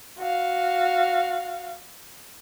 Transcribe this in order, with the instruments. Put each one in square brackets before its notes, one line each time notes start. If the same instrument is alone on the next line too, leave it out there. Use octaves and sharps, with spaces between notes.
[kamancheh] F#4 F5